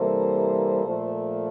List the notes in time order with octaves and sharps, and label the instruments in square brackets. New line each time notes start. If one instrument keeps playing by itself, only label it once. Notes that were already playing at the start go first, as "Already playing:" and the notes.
Already playing: [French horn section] C3 E3 G3 A#3 A4 C5
A#2 F3 A3